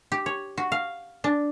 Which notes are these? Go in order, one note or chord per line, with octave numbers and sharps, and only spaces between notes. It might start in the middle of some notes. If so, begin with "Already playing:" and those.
G4
C#5
F#4
F5
D4